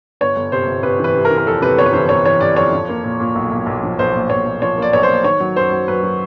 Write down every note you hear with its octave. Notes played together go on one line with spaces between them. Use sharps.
G1 C#5
G1
C3 C5
G1
C3 B4
E3 B4
C3
A#4
E3
A#4
F2 A4
C3 B4
G1 C#5
B4
E3 C5
G1 C#5
E3 C#5
C3 D5
F2 C#5
F3
A#3
A#2
A#2
B1
B1
B1
F3
B1 C5
A#2
B1 C#5
B1
F3 C#5
A#3 D5
B1 C#5
C5
A#3
D#3 C#5
F#3
F#2 C5
F#3
F#2 B4
F#3